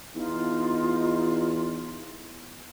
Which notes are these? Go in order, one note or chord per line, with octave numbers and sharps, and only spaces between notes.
E2 D#4 F4